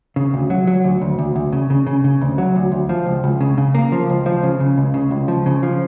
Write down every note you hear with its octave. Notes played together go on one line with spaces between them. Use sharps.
C#3
D2
F#3
F#3
D2
D2
D2
D2
C#3
C#3
C#3
C#3
D2
F#3
D2
D2
F3
C#2
C#2
C#3
C#3
A#3
F3
C#2
F3
C#3
C#3
C#2
C#3
C#2
F3
C#3
F3